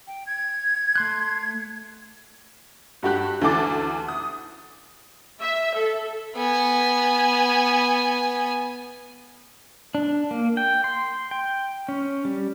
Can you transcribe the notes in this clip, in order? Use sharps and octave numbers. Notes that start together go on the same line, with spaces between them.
G5
G#6
A3 C6 F#6
G2 F#4 G4 F#6
D2 E3 A4 D6 A6
D#6
E5
A4
B3 G#5
D4
A#3
G5
C6
G5
C#4
G3